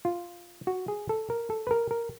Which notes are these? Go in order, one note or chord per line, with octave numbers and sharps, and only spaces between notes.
F4
F#4
G#4
A4
A#4
A4
B4
A#4
A#4